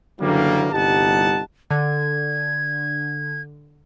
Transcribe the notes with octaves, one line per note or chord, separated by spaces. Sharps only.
F#1 D3 E3 F#3 G3 A#3
G1 C2 D#4 G4 F#5 A5
D3 G#6